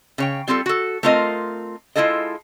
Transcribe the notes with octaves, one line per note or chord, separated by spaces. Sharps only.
C#3 C#5 G5
G3 C4 F4 G4 A4
F#4 A4
A3 C4 F4 A#4 D#5
G#3 A3 E4 F4 A4 D#5